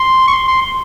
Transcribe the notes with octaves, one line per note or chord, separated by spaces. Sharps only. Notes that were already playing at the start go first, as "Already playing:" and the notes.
Already playing: C6
C#6
C6
C6
C6